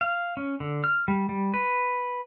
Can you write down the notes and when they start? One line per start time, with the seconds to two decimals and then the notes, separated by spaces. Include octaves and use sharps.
0.01 F5
0.37 C#4
0.60 D3
0.84 F6
1.08 G3
1.29 G3
1.54 B4